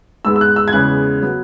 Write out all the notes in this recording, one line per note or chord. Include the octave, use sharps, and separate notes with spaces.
G#2 G#3 B3 E6
E6
F#6
E6
G#6
E2 C#3 G#3 B3 F#6
F#3 B3